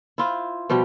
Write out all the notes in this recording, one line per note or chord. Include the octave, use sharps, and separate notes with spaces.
E4 F4 C5
B2 F3 G3 G4